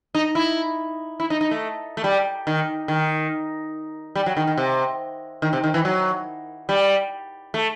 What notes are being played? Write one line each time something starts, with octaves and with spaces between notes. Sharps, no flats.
D#4
E4
E4
D#4
D#4
A3
A3
G3
D#3
D#3
G3
F#3
D#3
D#3
C3
D#3
C3
D#3
E3
F#3
G3
A3